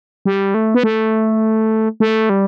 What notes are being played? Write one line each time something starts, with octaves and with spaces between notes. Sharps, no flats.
G3
A3
B3
A3
A3
G3